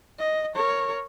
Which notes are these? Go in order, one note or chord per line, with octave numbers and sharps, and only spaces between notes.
D#5
A#4 C#5